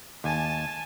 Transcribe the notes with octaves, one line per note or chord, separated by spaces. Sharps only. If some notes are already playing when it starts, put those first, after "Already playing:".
D#2 G#5 A5